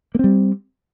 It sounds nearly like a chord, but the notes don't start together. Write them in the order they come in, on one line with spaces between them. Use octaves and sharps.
A#3 C4 G3